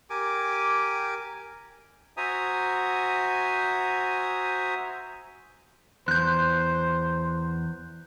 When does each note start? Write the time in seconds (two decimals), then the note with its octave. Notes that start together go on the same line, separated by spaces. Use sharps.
0.10 G4 A#4 G#5 D6
2.17 F#4 C5 E5 G#5 A#5 D#6
6.08 E2 C5 F#6 G6